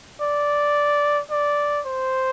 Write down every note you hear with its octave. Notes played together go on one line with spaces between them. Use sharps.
D5
D5
C5